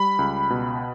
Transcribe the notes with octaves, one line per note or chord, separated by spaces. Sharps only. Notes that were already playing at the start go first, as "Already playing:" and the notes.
Already playing: G3 B5
C#2
B2